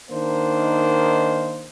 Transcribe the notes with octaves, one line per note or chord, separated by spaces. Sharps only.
D#3 A#3 D4 D#4 C5